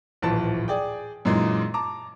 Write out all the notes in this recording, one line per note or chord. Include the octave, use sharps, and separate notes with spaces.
D1 A#1 E3 F3 A5
G#4 D5 G5
F#2 A#2 E3 G#3 D#4
A5 A#5 D6